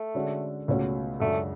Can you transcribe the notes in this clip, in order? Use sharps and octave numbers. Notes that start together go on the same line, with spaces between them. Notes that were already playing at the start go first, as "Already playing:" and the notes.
Already playing: A3
D3 G#3 C#4 F#4
C#2 B2 A3 C#4 F#4
F#2 C#3 G#3 A3 D4 F#4